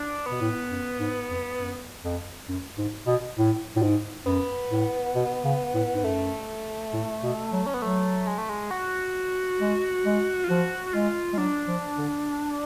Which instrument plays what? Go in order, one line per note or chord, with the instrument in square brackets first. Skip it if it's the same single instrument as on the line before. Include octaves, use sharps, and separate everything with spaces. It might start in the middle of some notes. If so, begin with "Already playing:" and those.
Already playing: [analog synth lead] D4
[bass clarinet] B2 [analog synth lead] B3
[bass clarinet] A2
F#2
G#2
F2
F#2
F2
F#2
G#2
B2
A2
A2
G#2
[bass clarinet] F#2 [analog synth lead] B3
[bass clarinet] A2
B2
C#3
A2
G#2
[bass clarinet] F#2 [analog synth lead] A3
[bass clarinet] A2
B2
F#3
[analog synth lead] C#4
B3
[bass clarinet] F#3 [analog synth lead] A3
[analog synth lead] G#3
A3
G#3
F#4
[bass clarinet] G#3
G#3
[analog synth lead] F4
[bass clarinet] F3 [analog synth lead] F#4
[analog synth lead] F#4
[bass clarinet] G#3 [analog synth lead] F4
[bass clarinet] G#3
[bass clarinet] F#3 [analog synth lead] D4
[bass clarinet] F3
D3